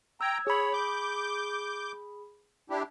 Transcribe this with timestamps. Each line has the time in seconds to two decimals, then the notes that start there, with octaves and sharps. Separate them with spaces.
0.21 G5 A#5 E6 G#6
0.47 G#4 C#5 B5
0.73 D6 G6
2.70 D4 E4 G4